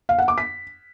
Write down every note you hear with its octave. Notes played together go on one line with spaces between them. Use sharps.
F5
F#5
D6
B6